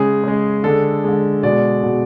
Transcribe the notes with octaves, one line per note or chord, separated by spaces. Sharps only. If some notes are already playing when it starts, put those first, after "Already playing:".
Already playing: C#3 G#3 G#4
C#3 G#3
D3 G#3 A4
D3 G#3
B2 G#3 D5
B2 G#3